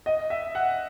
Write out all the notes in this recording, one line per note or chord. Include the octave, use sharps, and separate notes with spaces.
D#5
E5
F#5